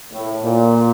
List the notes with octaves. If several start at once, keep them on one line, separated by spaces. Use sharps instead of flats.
A2
A#2